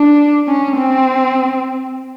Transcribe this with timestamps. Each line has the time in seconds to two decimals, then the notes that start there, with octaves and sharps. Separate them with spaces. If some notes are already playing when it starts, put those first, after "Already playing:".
Already playing: D4
0.48 C#4
0.78 C4